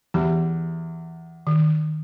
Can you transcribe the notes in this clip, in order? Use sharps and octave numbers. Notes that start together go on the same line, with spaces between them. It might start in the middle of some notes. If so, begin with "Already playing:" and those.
E2 G4
D#3